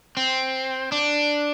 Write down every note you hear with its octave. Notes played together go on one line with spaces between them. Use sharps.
C4
D4